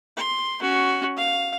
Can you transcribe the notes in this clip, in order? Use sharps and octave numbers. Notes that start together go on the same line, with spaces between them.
C6
C#4 F#4
F5